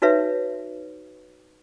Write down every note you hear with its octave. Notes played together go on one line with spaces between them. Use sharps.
D#4 F#4 B4 C#5 E5